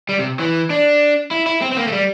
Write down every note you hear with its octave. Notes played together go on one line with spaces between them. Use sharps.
G3
C3
E3
D4
E4
E4
C4
C4
A#3
A3
G3